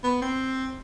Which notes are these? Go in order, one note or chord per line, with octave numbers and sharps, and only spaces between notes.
B3
C4